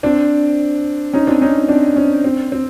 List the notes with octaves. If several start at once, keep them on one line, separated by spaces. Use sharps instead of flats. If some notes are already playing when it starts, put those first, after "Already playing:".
C4 D4
C#4 D#4
C4 D4
C#4 D#4
C4 D4
C#4
C4
C4